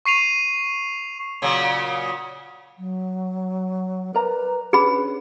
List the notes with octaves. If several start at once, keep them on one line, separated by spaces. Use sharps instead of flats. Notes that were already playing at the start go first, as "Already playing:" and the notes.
C#6 C7 D#7 F7
A#2 C#3 F#3
F#3
A#4 B4 D5 A#5
C#4 D4 G#4 B4 B5